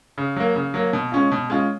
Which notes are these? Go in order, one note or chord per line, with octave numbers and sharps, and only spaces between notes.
C#3
F#3 A#3
C#3
F#3 A#3
B2
G#3 C#4 F4
B2
G#3 C#4 F4